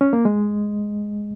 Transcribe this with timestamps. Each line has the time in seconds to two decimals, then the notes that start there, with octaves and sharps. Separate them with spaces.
0.01 C#4
0.13 A#3
0.25 G#3